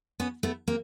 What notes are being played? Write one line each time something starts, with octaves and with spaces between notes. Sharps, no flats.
B3 C#4
A3 B3
A#3 C4